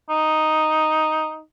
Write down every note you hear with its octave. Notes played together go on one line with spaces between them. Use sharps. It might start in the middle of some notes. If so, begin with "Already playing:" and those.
D#4